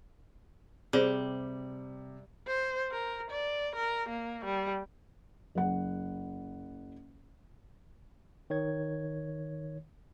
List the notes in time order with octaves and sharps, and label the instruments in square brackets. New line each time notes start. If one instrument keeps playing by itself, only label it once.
[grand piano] C3 [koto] G3 [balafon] G#4 C5
[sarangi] C5
A#4
D5
A#4
A#3
G3
[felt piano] F#1 F#5
[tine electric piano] D#3 C#5 G#6